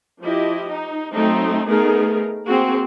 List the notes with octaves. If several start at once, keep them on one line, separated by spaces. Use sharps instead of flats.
F3 E4 G4 D#5
D#4
F#3 A3 C4 D#4
A3 B3 D#4 G#4 A#4
A#3 C4 F#4 G#4